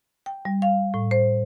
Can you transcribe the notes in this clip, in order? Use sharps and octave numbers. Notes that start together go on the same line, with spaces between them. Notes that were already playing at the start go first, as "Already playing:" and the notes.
G5
G3
F5
A2
C5